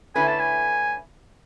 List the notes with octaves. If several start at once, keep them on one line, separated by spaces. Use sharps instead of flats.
D3 A3 C#4 E4 B4 G#5
A5
G#5